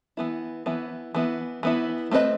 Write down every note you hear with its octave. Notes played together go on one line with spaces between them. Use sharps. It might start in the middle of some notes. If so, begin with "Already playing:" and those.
E3 B3 E4
E3 B3 E4
E3 B3 E4
E3 B3 E4
A3 C4 F#4 B4 D#5